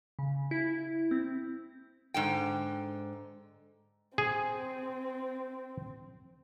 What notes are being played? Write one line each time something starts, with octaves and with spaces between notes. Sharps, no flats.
C#3
E4
C4
G#2 D3 G5
C4 G#4